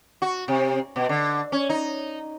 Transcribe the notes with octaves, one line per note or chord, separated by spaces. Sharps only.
F#4
C3
B2
D3
C#4
D#4